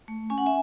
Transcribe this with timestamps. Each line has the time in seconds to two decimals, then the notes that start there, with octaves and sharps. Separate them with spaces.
0.08 A3
0.30 C#4 G#5
0.38 F#5
0.46 E5 G#5